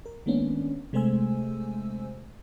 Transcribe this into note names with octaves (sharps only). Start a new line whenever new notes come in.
A#4
D#3 G#3 A#3 B3 C#4 D4
C3 G#3 A3 C5 G#5 E6